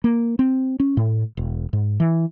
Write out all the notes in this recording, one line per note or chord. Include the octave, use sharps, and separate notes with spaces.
A#3
C4
C#4
A2
E1
G#2
E3